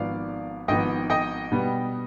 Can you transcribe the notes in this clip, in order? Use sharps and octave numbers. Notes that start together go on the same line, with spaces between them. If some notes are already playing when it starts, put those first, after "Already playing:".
Already playing: G#1 G#2 F3 B3 D5 F5
G#1 G#2 F3 B3 D#5 G5
D#5 G5
B2 G3 B3